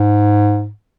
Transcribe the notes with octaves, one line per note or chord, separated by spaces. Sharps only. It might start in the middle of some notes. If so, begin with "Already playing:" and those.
Already playing: G#2